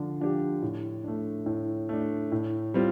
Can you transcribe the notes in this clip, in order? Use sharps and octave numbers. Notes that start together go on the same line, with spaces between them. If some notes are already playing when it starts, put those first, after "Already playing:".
Already playing: D3 F3 D4
F3 D4 G4
A2
A3 D4
A2
A3 D4
A2
G3 C4 F4